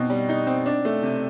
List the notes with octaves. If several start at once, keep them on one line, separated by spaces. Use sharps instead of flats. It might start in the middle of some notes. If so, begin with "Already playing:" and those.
Already playing: B2 C4 D#4
G3
D#4
C4
D4
A3
C3